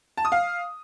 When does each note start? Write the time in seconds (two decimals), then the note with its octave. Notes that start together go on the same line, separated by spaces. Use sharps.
0.17 A5
0.25 D#6
0.32 F5